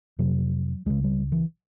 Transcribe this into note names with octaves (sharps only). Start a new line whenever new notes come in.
F2 C3 F#3
C#2 C#3 G#3
G3
E3